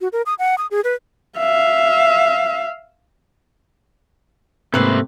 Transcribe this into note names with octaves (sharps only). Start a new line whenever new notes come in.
F#4
A#4
D#6
F#5
D#6
G#4
B4
E5 F5
G#2 C3 A3 A#3 E4 B4 C5